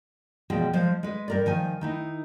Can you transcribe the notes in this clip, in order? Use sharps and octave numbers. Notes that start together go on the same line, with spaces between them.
E2 B2 F3 G#3 G5
F3 G#3 C5
G#3 B4
G2 A#4 D5
D#3 F3 G#5
D#3 D#4 E4